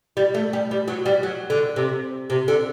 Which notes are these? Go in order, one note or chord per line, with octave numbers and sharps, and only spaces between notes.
G3
A3
G3
G3
F#3
G3
F#3
D3
C3
C3
D3